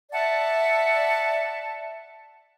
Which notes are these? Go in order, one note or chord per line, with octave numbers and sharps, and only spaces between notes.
D5 E5 F#5 A5